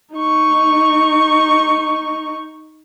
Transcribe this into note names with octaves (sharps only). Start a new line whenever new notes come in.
D#4 C#6